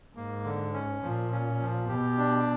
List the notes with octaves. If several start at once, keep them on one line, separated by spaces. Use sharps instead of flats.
G#2 A#3
D3
C#4
A#2 F3
C#4
F3
B2 G4
D4